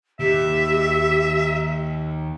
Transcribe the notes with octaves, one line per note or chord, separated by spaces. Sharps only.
D#2 G4 E5